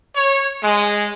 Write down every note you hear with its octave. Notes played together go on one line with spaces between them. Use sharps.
C#5
G#3